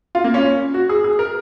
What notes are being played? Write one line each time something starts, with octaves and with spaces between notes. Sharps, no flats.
F4
A#3
C#4
F#4
G#4
G#4
A#4